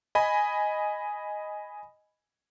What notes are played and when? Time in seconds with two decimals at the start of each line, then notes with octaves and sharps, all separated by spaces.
0.15 D#5 G#5 B5